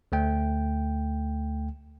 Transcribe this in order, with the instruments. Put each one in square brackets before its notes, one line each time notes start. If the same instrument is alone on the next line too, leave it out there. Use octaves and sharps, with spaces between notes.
[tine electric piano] D2 A3 G5